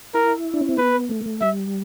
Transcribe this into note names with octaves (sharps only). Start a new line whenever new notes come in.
E4 A#4
D4
C#4
C4
B3 B4
A3
A#3
A3
G3 E5